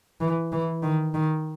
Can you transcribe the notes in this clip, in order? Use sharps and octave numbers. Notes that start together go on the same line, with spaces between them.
E3
E3
D#3
D#3